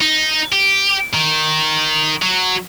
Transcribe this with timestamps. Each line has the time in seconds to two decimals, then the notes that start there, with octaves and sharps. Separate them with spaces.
0.01 D#4
0.52 G4
1.14 D#3
2.22 F#3